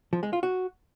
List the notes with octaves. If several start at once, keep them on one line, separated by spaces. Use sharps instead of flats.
F3
G#3
F4
F#4